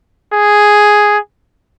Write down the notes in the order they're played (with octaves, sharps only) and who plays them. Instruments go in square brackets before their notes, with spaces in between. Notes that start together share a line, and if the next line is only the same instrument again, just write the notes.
[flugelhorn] G#4